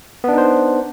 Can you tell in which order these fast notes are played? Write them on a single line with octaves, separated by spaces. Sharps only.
B3 D4 D#4 C5